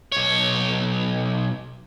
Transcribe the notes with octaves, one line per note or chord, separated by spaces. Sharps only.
B1 C#5